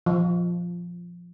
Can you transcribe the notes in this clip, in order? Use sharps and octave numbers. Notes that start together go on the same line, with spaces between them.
F3